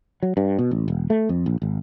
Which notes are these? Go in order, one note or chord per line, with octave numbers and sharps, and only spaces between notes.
F#3
G2
B2
A1
E1
A3
F2
A#1
G#1